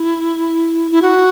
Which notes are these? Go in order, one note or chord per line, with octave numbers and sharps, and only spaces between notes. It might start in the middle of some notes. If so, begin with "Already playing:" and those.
Already playing: E4
E4
F#4